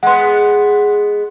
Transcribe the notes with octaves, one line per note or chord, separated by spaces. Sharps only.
G#3 B3 F#5 C6